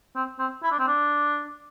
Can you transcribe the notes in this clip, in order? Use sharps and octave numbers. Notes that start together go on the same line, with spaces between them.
C4
C4
E4
D4
C4
D4